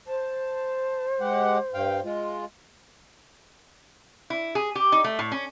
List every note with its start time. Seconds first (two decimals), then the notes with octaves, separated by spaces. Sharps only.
0.07 C5 A5
1.20 G#3 G4 F#5
1.74 G2 F5 G5
2.05 G#3 F4
4.30 E4
4.55 G#4
4.75 G4
4.92 D#4
5.04 A3
5.19 A2
5.32 C#4